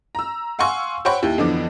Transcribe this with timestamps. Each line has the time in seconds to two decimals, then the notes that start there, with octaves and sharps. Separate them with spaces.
0.15 A#5 E6
0.59 F5 F#5 G#5 C6 C#6 E6
1.05 C5 C#5 F#5 G5 B5 C#6
1.22 D#2 E4 G4
1.38 F2 D3 E3 F3 B3 D6